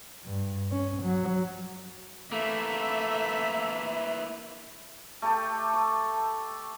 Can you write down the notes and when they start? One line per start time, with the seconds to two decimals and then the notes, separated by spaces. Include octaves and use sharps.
0.25 G2
0.72 C#4
1.03 F#3
2.32 E3 A3 A#3 E5
5.22 A3 G4 A4
5.73 C#6